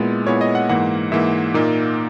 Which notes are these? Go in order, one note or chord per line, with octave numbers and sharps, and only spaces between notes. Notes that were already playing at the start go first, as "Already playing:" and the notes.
Already playing: A#2 G#3 B3 E4
A#2 G#3 B3 E4 C#5
D#5
F#5
G#2 E3 A#3 F#5
G#2 E3 A#3 E5
A#2 A#3 D#4